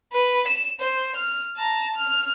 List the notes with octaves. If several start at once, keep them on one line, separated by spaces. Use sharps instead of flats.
B4
E7
C5
F6
A5 A#5
F6